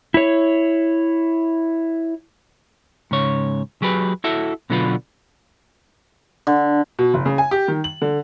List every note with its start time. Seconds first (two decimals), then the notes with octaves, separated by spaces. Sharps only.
0.14 E4 C#5
3.11 G#2 C#3 C#5
3.82 F#3 G4 G#4 B4
4.24 E4 F#4 A4 E5
4.70 B2 D3 F#3 B3 F4 B4
6.47 D3
6.99 B2
7.14 F#1
7.26 C#3
7.38 G#5
7.51 G4
7.68 D#3
7.84 F#7
8.02 D3